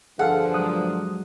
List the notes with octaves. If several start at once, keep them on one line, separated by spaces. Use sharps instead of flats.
G2 D3 F3 G#4 A4 F5 F#5
F#3 G#3 D#6 F#6